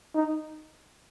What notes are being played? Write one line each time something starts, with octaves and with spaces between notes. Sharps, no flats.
D#4